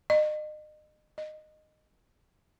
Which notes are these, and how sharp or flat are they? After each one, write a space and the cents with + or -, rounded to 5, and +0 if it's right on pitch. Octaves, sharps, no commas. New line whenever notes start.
D#5 -35
D#5 -15